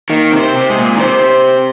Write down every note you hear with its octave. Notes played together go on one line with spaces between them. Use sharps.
D#3 A#3 A#4
C3
C4 C5
C3
G#3 G#4
A#2
D#3
C3 C4 C5
C4 C5